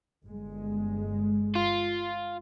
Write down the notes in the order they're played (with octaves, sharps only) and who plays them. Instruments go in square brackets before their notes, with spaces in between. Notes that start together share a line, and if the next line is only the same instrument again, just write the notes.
[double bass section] G1 G#3
[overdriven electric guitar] F4